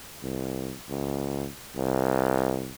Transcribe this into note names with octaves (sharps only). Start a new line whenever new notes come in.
C2
C#2
C2